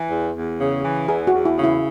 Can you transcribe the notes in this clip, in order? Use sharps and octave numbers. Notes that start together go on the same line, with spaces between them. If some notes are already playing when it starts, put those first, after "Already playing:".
Already playing: E3
E2
E2
C#3
E3
E2 G#4
F#4
E2
E4
C#3
E4